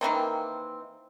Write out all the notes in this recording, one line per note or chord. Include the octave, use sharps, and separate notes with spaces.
D#3 E3 A#3 C4